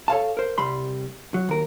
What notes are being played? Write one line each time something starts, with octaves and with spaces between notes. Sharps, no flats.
A4 C#5 F5 A5
A#4 C5
C2 G3 B5 C6
F#3
D#2 A#4